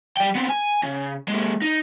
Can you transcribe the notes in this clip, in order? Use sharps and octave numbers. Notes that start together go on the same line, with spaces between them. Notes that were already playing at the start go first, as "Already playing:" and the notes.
G3 G5
B3 C4
G#5
C#3
G#3 A#3
D#4